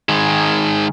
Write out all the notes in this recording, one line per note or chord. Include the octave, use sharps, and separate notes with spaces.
D#3 G#3